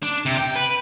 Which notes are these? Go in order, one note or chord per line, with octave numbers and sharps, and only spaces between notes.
D4
C3
G5
B4